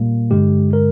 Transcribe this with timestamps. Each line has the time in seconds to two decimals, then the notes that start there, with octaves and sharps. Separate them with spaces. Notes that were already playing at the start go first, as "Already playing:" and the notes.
Already playing: A#2 G3 A#3
0.30 G2 D3 G#3 G4
0.73 A#4